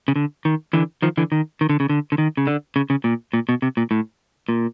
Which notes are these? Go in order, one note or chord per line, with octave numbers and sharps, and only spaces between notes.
C#3
D3
D#3
D3 E3
D#3 F3
D3 E3
D#3
D#3
D3
C#3
D3
D3
D#3
C#3
D3
C#3
C#3
A#2
A#2
B2
C3
A#2
A2
A#2